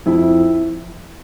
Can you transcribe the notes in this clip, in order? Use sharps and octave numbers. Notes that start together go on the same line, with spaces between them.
F2 E4